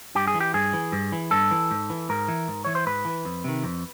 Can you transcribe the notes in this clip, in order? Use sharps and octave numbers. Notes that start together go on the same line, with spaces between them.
G2 G4
G#4
E3
G4
G2 G#4
E3
G2
E3
G2 A4
E3
G#2
E3
G#2 A#4
E3
G#2
E3 C#5
C5
G#2 B4
E3
F2
C3 D#3
F2